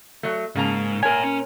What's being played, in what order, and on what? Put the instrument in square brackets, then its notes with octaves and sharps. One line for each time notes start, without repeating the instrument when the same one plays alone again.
[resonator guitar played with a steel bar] F#3 A3
[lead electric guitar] G#2 [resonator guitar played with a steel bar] C#3 A#3 A#5
[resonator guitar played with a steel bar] A#2 A#4 [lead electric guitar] C#5 E5 [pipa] G#5
[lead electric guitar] C#4